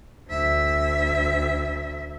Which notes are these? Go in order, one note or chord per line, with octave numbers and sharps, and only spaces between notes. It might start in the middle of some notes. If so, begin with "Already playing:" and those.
D2 E5